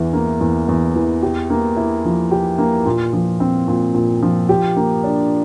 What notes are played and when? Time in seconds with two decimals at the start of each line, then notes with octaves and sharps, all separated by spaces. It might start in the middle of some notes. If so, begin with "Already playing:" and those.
Already playing: E2 E3
0.13 A#3
0.41 E2
0.68 E2
0.96 E3
1.23 G4
1.50 A#3
1.76 E4
2.05 F3
2.31 G4
2.58 A#3
2.86 A#2
3.13 F3
3.40 C4
3.68 A#2
3.95 A#2
4.22 F3
4.49 G4
4.77 A#3
5.04 D4